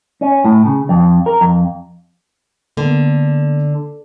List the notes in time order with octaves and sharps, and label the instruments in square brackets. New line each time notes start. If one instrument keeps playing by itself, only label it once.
[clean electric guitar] C#4
A2
C#3
F2
A#4
F2
[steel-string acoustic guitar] D3 [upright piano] A#3 B3